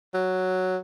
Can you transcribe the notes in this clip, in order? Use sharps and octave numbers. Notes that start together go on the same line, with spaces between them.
F#3